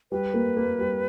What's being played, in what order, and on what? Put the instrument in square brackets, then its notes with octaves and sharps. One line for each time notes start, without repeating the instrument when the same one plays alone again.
[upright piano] G3 [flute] B4
[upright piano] A#3
A#3
G3